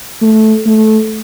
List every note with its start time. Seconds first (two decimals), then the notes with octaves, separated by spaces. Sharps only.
0.22 A3
0.66 A3